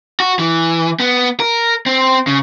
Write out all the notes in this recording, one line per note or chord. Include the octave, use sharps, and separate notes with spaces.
F#4
E3
B3
A#4
C4
C#3